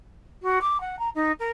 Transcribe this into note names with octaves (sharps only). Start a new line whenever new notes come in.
F#4
D6
F#5
A#5
D#4
A#4